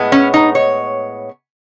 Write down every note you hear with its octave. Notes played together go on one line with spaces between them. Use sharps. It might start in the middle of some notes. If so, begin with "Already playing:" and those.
Already playing: A2 G#3 B3
C#4
D#4
C#5